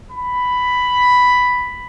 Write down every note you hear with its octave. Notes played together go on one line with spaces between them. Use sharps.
B5